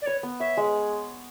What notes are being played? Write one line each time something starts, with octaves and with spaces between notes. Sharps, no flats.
D5
B4 C#5
B3
C#5 E5
G#3